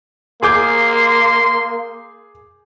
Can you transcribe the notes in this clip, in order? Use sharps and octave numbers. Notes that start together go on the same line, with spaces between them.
A#3 G#4 C6 D6 G6